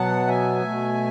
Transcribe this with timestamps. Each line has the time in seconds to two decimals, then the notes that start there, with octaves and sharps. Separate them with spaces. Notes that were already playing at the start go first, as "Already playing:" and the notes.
Already playing: B2 F#3 B3 F#5 A5
0.27 E5 G#5
0.63 B2 A3